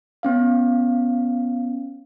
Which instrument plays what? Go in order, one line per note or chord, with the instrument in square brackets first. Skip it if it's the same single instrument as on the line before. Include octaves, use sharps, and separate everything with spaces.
[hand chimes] B3 C#4 F5